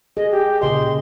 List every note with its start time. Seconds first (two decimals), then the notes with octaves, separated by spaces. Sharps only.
0.17 G#4 D#5
0.31 G4
0.62 A#2 C#3 D#5 C6